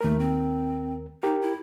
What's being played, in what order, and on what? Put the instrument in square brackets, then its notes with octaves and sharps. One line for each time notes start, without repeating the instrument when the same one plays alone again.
[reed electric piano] D#2 A#4 [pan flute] A3
[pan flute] C4
[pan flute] D#4 [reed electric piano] G4 A#4
[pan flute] E4